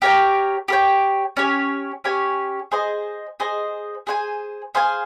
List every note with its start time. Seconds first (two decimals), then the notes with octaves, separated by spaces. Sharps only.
0.02 G4 A#4 C#5 G5
0.68 G4 A#4 C#5 G5
1.37 C#4 G4 C#5 G#5
2.04 C#4 G4 C#5 G#5
2.72 G#4 C5 D#5
3.40 G#4 C5 D#5
4.07 G#4 C5 F5 G#5
4.75 G#4 C5 F5 G#5